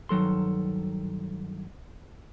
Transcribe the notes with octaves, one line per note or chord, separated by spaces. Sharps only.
G2 D#3 F#3 A4 C6